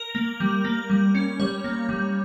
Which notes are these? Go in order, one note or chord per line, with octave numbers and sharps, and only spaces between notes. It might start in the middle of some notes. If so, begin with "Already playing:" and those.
Already playing: A#4
A#3
G3
A#3
G3
C#4
G3 C#5
A#3
G3